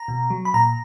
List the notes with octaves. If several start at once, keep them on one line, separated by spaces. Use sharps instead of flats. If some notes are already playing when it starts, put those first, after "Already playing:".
Already playing: A#5
B2
F#3
B5
A#2 A#5